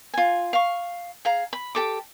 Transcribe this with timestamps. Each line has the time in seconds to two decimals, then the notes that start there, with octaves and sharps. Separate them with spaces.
0.14 F4 G#5
0.53 F5 C#6
1.25 G#4 F5 A#5
1.53 B5
1.75 G4 A4 D6